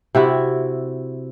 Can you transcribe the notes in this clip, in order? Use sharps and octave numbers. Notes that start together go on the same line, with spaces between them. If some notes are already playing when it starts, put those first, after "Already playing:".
C3 E4 F#4